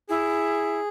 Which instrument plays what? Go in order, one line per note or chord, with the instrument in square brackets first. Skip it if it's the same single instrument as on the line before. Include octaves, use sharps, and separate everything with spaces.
[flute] E4 [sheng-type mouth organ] G#4